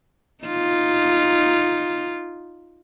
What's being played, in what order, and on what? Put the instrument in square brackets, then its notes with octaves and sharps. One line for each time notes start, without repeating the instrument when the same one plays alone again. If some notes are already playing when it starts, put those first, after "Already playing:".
[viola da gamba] D#4 F4